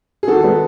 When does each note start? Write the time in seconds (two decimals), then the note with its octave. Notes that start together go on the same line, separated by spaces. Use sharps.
0.23 G#4
0.28 D#3 F#4 A4
0.44 G#3 B3